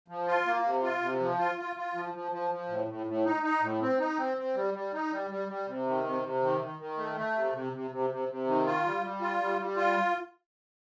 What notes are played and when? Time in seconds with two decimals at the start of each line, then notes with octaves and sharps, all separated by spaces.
0.08 F3
0.27 F4
0.46 A#3
0.64 C3
0.83 F4
1.02 C3
1.20 F3
1.39 F4
1.58 F4
1.76 F4
1.94 F3
2.14 F3
2.32 F3
2.51 F3
2.69 A2
2.88 A2
3.07 A2
3.25 D#4
3.43 D#4
3.62 A2
3.81 C4
3.99 D#4
4.18 C4
4.37 C4
4.55 G3
4.74 G3
4.93 D#4
5.11 G3
5.30 G3
5.49 G3
5.67 C3
5.87 D#3
6.04 C3
6.23 C3
6.42 D#3
6.61 D#3
6.79 D#3
6.97 A3
7.16 A3
7.35 C3
7.53 C3
7.73 C3
7.91 C3
8.10 C3
8.29 C3
8.47 D#3
8.66 F4
8.85 G3
9.02 G3
9.21 F4
9.40 G3
9.59 G3
9.77 F4